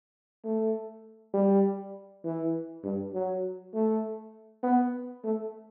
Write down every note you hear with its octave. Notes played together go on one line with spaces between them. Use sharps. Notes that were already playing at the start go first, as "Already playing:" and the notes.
A3
G3
E3
G2
F#3
A3
B3
A3